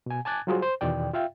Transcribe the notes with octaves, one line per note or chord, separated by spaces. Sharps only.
B2 G#5
G#5 A5 D6 F#6 G#6 A6
F#3 G3 F4 F#4 G#4 C5
C5
E2 B2 D#3 D5 G5
F4 E5 F5 G5